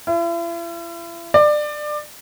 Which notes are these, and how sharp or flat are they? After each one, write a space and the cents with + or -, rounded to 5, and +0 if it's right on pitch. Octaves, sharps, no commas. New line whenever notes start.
E4 +45
D5 +25